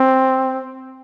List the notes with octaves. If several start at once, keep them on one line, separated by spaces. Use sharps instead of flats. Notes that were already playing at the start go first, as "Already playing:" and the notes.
Already playing: C4